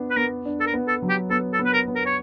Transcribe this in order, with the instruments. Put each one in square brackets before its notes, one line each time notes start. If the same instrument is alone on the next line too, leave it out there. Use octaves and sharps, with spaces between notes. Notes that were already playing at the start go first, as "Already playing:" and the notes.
Already playing: [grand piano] B3 D4
[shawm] B4
[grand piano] B3 [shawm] A#4
[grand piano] D4
[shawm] A4
A#4
[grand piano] B3
[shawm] A4
[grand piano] F#3
[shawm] G4
[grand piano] B3 [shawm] A4
[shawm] A4
[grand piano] B3
[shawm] B4
A#4
[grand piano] B3
[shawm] A#4
C#5